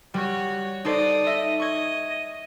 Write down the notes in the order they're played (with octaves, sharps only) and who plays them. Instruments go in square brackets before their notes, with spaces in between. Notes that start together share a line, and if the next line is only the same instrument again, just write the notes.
[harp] G3 [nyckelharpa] F#4 C#5
[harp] D#4 A4 C5 [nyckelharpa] D5 D#6
[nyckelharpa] D#5 [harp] E5
[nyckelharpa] D#5 [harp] C#6 G#6